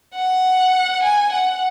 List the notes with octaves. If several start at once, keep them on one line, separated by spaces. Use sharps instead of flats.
F#5
G#5
F#5